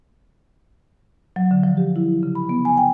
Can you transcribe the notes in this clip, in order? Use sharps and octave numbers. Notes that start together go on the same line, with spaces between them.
F#3
D3
F3
G4
E4
C#3
B5
B3
G#5
G5